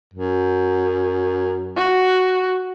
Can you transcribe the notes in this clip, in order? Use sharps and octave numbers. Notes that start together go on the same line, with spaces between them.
F#2
F#4